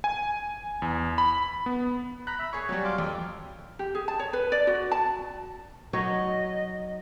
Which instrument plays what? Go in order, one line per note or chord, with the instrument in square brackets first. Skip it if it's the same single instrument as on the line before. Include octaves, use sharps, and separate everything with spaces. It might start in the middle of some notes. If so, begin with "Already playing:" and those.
[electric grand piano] G#5
E2
B5
B3
[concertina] A#5 B5 [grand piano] F#6
[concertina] E5 B5
[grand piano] G#4 C#6 [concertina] C#5
[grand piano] F#3 G3
[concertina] F5 C6 D6
[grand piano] F2 [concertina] A4
[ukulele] G4
G#4
A5
C#5
B4
D5
F#4
A5
[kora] F#3 D#4 C#5 [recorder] D#5